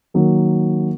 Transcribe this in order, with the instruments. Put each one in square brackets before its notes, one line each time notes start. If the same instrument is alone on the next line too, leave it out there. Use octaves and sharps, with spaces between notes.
[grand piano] D#3 F#3 A#3